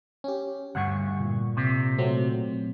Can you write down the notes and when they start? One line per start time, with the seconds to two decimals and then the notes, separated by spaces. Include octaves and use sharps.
0.24 C#4 G4
0.75 D2 G2 F#5 C#6
1.20 A#2
1.57 C3
1.98 F#3 A3 C4